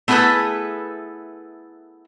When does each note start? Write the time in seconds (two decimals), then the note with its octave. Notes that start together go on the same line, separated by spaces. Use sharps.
0.08 A3 B3 E4 G#4 A4 B4